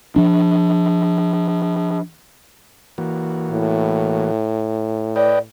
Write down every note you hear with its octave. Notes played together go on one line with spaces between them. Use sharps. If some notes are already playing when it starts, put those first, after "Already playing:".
F3 D4
E3 A#3 F#4
A2
B4 D5 D#5 G5